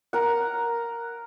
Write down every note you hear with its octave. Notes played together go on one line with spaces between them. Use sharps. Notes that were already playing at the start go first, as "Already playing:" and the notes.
A#4 F#5